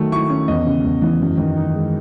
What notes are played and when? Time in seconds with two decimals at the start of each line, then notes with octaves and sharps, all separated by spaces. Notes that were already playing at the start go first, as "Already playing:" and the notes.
Already playing: D#3 F#3 A3
0.12 E4 C#6
0.29 C#4
0.48 E2 D#5
0.66 C#3
0.84 E2
1.02 E3
1.21 F#2
1.38 D#3
1.57 D#4
1.75 G#3